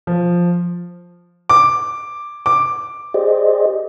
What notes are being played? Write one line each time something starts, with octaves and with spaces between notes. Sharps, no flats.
F3
D6
D6
G4 G#4 C5 D5 D#5